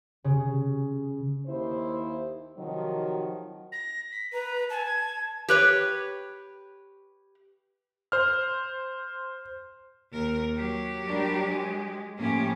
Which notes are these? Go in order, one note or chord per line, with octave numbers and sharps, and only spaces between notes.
C#3
D#2 E4 C5
C3 D#3 F3 F#3 F#4
A#6
B6
B4 A#5
G#5 A5
G#6
G4 B4 C#5
C5 F6
D#2 A#4
F#3 G4
G3 D4 A#4
G#3
A2 F3 A#3 C#4 G4